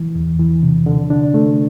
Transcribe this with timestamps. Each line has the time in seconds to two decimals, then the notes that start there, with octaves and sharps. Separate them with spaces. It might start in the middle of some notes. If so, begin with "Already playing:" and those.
Already playing: E3
0.15 E2
0.39 E3
0.63 C3
0.86 D3
1.10 D4
1.34 A3